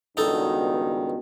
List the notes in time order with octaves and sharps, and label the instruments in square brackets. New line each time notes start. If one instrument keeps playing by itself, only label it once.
[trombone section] C#2 G2 D#3 [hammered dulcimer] B2 D4 A5 [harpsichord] D#4 A4